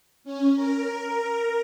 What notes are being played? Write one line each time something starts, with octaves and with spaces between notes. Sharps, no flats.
C#4
A#4